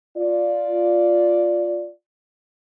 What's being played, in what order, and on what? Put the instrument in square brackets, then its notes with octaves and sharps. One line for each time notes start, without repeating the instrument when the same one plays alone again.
[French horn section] F4 D5